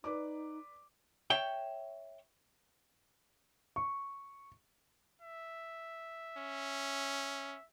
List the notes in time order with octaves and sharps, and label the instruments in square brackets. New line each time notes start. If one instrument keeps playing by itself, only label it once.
[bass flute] D#4 [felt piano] B4 D5 D6
[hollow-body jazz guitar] C#5 E5 G5
[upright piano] C#6
[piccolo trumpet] E5
[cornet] C#4